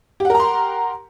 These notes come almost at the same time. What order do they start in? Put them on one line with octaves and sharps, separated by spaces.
G4 F#5 A#4 A#5 C6